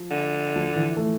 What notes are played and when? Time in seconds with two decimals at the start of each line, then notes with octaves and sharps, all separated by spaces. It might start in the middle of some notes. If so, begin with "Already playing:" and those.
Already playing: F3
0.11 D3
0.56 F3
0.76 E3
0.97 A3